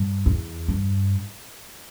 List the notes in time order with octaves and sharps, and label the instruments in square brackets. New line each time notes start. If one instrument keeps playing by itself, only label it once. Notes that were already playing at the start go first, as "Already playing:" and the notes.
Already playing: [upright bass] G2
E2
G2